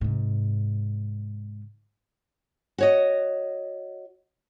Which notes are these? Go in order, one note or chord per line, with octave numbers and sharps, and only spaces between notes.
G#2 C3
F#4 C#5 D#5